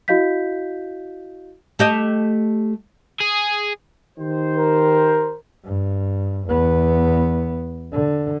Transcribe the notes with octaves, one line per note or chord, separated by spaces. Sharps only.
E4 F#4 D#5 F5 G6 B6
A3 G4 D#5
G#4
D#3 G4 C5
A#4
G2
E2 B3
D3